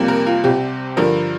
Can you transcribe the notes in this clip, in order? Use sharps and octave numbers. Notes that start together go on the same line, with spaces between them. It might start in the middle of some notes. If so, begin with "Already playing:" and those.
Already playing: F2 C3 G3 A#3
A#4
F4
C2 C3 G3 C4 G4
G2 D3 F3 A#4